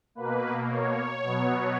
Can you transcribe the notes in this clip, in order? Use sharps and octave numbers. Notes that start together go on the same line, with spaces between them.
B2 A#3 B4
C#5
B2 F#3 B3